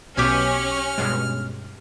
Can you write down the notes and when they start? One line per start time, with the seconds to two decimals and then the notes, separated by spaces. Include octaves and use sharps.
0.17 B1 B2 C#4 G4 E5 G#5 F6
0.98 G2 B2 G#3